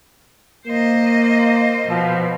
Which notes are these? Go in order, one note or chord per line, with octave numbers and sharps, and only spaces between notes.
A#3 C5 D#5
B2 F3